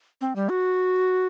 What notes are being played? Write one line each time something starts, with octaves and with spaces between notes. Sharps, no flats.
C4
G3
F#4